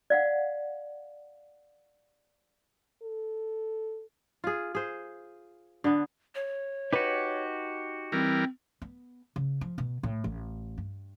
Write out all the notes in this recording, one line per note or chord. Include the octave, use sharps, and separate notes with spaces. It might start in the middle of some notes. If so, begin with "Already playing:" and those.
D5 F5 F#5
A4
F4 G#4
G#4 C5
D3 B3
C#5
D#4 F#4 G4 B4
E3 G3 C4 A#4
B3
C#3
F3
B2
A2
A1
G2